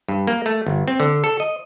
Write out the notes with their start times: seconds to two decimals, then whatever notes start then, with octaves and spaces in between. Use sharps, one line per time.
0.08 G2
0.27 A#3
0.46 A3
0.66 G1
0.88 C4
1.00 D3
1.24 A4
1.40 D#5